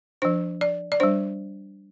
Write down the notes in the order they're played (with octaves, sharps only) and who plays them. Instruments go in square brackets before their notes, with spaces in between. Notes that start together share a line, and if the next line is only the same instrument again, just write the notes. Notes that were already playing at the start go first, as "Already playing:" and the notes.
[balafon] F3 D4 C5
D5
D5
G3 D4 C5